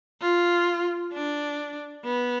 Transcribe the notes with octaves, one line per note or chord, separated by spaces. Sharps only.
F4
D4
B3